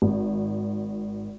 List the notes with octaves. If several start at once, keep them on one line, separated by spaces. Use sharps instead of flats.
G#1